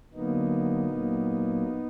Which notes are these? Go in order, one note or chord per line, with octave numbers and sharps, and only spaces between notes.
D3 F#3 A#3 B3 D#4
A#2 F#3 A#3